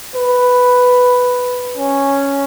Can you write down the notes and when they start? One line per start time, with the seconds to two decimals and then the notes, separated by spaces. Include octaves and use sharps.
0.15 B4
1.77 C#4